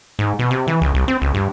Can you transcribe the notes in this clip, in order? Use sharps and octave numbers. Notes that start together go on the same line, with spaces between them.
G#2
B2
C3
E3
C#2
C2
C4
C#2
G2